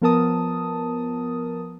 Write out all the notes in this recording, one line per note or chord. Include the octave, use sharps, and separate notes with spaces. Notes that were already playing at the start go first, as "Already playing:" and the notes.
F3 B3 A#4 A5 D#6